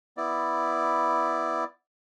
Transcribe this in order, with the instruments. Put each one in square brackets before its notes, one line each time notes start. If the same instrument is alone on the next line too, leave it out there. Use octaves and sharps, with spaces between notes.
[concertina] B3 E4 D5